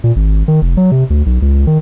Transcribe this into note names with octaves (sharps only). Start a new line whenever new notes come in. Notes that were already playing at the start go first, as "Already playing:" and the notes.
A#2
G#1
D#3
F1
F#3
C3
D2
B1
C#2
D#3